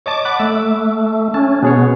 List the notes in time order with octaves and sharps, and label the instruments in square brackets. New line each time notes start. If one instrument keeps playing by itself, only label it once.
[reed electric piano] C#5 D#5 A5 [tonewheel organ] D6
[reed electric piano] F#5 B5 F#6
[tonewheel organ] A3 [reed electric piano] E6
[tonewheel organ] C#4 [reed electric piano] A5
[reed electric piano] B2 G#4 C#5 [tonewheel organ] B3